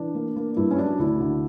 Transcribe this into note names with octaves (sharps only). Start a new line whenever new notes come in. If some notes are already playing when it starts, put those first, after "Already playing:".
Already playing: E3 D4
A#3
A#3
G2 E4
C#4
F#3 D4
D2 E4
D3